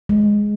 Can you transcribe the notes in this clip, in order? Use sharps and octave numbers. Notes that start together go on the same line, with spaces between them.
G#3